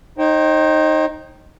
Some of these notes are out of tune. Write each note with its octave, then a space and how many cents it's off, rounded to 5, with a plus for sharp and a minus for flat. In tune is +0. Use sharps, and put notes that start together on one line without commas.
D#4 +0 C5 +40 G5 -15